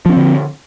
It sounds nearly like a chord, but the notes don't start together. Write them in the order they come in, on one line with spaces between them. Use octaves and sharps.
F3 C#4 C4 D3